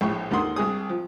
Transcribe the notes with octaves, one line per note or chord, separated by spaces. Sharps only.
A#1 A2 G5 C#6
D#2 D3 D#3 F#5 C6 D#6
C2 G#4 D#6
F3